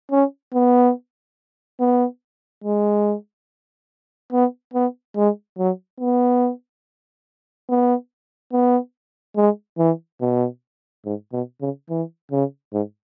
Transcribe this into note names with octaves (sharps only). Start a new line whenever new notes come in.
C#4
B3
B3
G#3
B3
B3
G#3
F#3
B3
B3
B3
G#3
E3
B2
G#2
B2
C#3
E3
C#3
G#2